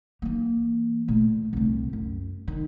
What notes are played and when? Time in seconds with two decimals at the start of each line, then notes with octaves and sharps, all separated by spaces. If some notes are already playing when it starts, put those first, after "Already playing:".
0.22 E3 A#3
1.08 A#2 A3
1.53 C2 A3
1.93 F#2
2.48 D#3